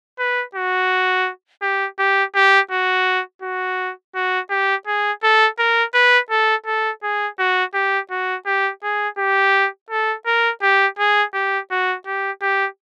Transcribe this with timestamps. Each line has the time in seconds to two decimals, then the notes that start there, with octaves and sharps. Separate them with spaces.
0.19 B4
0.55 F#4
1.62 G4
1.99 G4
2.35 G4
2.71 F#4
3.42 F#4
4.15 F#4
4.50 G4
4.87 G#4
5.23 A4
5.59 A#4
5.94 B4
6.30 A4
6.66 A4
7.03 G#4
7.39 F#4
7.74 G4
8.11 F#4
8.46 G4
8.83 G#4
9.18 G4
9.90 A4
10.26 A#4
10.62 G4
10.99 G#4
11.34 G4
11.71 F#4
12.06 G4
12.42 G4